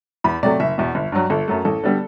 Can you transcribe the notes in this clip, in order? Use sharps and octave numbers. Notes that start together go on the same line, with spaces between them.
E2 B5
C3 F#3 A3 D5
F#1 E5
E2 B2
G1
G2 F#3
G1 A4
F#2 F#3 A3
A1 A4
D3 G3 B3